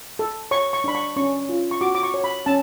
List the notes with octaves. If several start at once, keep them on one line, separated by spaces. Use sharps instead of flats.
A4
C#5 C#6
C#6
D4 B5
C#6
C#4 C#6
F4
C#6
F#4 D6
D6
C#6
C#5
B5
C#4 A5